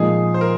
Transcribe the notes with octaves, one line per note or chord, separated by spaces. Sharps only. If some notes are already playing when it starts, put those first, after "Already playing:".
Already playing: A#2 F3 G#3 D#4 G#4
C5
A#4